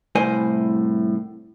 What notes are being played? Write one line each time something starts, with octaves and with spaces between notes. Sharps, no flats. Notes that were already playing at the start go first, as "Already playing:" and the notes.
C2 A2 C5 G#5